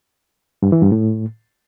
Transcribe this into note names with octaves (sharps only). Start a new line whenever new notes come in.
G2
E3
G2
A2